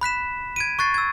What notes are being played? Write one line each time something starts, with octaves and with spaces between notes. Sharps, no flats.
B5 F#6 B6 E7
G#6 D7 D#7
C#6 F#6 A6 C7
E6 G#6